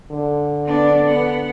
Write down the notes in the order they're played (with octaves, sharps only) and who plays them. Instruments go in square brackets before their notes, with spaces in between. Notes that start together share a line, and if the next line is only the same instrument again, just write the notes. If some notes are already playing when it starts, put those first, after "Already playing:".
[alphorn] D3
[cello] B3 D4
B3 F#5